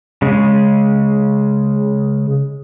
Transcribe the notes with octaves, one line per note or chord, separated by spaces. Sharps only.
C#3 G#3